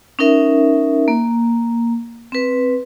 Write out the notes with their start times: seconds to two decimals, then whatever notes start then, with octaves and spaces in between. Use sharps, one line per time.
0.19 C#4 D#4 A#4 E5
1.08 A#3
2.32 C4 B4